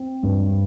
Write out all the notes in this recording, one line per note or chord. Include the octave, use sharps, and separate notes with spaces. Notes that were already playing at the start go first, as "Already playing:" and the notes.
Already playing: C4
G2